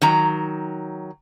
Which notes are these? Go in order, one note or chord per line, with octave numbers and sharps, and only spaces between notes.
D#3 F#3 A#5